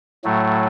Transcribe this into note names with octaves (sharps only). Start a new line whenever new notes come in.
A2 F#3 A3